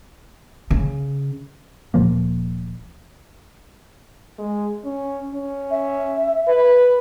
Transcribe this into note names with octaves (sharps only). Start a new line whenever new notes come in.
C#3
D1 A#2 F3 A#3
G#3
C#4
C#4
E5
B4